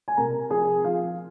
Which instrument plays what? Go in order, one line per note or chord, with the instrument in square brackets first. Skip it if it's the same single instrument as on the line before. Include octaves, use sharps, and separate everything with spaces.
[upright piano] G#5
C3 A#4 A#5
F3 G#4 G#5
F3 F4 F5